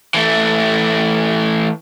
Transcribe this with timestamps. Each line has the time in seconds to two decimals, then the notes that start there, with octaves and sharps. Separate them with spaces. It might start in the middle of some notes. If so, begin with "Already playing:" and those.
0.14 E3 A3